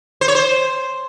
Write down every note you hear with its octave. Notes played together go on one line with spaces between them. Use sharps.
C5
C#5
C5